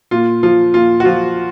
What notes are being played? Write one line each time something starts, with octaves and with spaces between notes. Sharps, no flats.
A#2 F4
F3 F4
A#2 F4
F#4
F3 F4